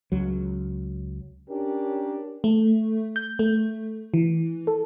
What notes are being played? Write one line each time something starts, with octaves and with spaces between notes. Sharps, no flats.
C#2 F#3
C#4 D4 G4 A#4
A3
G6
A3
E3
A4